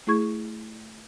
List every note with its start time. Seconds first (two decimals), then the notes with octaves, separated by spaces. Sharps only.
0.07 A3 E4 G#4 C#6 G#6